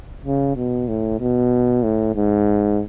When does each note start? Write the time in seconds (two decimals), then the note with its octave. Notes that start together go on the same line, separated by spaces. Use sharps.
0.25 C#3
0.56 B2
0.88 A2
1.20 B2
1.83 A2
2.15 G#2